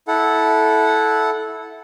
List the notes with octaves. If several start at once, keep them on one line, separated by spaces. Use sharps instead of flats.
E4 A4 F#5